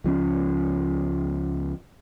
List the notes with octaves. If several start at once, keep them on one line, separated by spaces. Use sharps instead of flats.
C#2 F3 C4 C#4